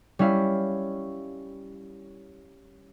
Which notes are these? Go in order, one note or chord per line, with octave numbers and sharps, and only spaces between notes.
G3 C#4 E4 F5